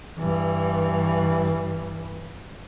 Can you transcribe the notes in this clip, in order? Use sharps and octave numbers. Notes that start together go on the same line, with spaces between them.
G2 E3